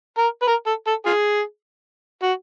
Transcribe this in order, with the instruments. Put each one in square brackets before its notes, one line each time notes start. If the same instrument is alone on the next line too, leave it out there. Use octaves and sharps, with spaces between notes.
[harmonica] A#4
B4
A#4
A4
A4
F4 G#4
F#4